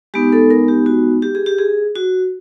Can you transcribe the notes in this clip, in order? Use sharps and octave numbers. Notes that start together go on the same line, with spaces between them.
G#3 B3 D#4 G4
A4
A#4
G4
F#4
G4
G#4
G4
G#4
F#4